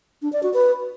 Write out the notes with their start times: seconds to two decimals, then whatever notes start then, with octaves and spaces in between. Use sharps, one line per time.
0.22 D4
0.33 D5
0.43 F#4
0.54 B4